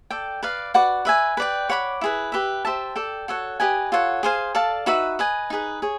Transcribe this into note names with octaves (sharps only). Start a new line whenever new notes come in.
A4 D5 G5
B4 D5 F5
F#4 B4 D5 F#5
B4 E5 G#5
B4 D5 G5
C#5 F#5 B5 D6
E4 G#4 B4
G4 B4 E5
G4 C5 E5 A5
A4 D5 G5
F#4 A4 C#5 F#5
G4 B4 D#5 G#5
F4 A4 C#5 F#5
G#4 C5 F5 G#5
A4 D5 F5 A5
D#4 F#4 B4 E5
B4 D#5 G#5
D#4 G#4 B4
G#4 C#5